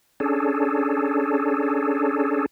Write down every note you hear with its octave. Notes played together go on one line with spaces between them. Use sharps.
C#4 D4 G#4 A4